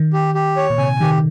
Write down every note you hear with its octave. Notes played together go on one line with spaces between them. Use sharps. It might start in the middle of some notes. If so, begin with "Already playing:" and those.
Already playing: D#3
G4
G4
C#5
A#2
C3 G#5
D#3 G4